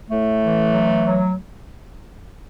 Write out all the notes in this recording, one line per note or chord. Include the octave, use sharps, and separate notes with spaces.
A2 A3
E3
F#3
F#3